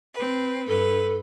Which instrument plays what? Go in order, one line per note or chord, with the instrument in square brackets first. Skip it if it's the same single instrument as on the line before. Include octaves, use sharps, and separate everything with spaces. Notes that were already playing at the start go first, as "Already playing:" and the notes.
[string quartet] C4 B4
[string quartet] G2 B4 [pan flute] A4